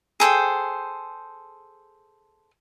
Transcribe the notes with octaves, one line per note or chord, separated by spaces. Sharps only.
G#4 A4 C5 G5